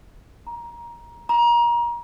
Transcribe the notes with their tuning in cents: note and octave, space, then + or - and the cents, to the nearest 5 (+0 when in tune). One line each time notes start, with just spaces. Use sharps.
A#5 +20
A#5 +30